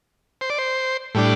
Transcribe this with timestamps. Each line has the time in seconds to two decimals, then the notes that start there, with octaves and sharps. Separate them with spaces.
0.41 C5
0.50 D5
0.58 C5
1.15 A2 G3 D4